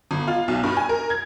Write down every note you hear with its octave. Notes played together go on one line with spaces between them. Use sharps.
G1
F4
B1
G2
G#5
A#4
G#6